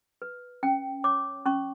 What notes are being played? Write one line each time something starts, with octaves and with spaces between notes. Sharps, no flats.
B4
C#4 G5
C#5 D6
C#4 C#6